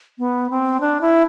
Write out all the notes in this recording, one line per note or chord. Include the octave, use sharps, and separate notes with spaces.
B3
C4
D4
E4